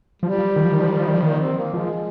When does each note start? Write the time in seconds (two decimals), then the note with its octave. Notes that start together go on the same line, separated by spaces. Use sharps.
0.22 F3 G3
0.38 F3
0.56 D#3
0.64 F3
0.73 D#3
0.82 F3
0.89 D#3
0.97 F3
1.07 D#3
1.15 F3
1.23 D#3 A#3
1.40 C4
1.57 A#3
1.74 F3 G#3